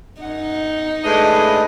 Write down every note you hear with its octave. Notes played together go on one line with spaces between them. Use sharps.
F#2 D#4 F#5
A2 G#3 D4 E4 B4 D#5